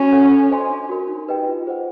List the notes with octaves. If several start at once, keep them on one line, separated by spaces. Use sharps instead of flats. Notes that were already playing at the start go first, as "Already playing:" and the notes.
Already playing: C#4 F#4
A4 C#5 F#5
A4
C5 D#5 G#5 C6
D4
F#4 A#4
D#4
G4 B4 D#5 G5
F4
G#4 C5 D#5 F#5